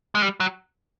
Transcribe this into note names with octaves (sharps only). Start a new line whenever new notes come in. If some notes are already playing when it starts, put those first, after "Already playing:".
G#3
G3
F#3